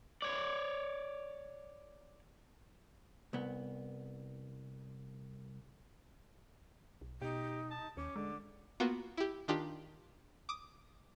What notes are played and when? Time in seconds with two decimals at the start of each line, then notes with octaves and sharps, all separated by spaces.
0.22 C#5 D5
3.33 C2 B3
7.01 B1
7.21 B2 D#4 G4
7.71 A5
7.97 D#2 C#4 D6
8.16 D3 G#3
8.80 A#3 B3 F4 F#4
9.17 E4 G4
9.48 D#3 D4 F4 G4
10.49 D6 D#6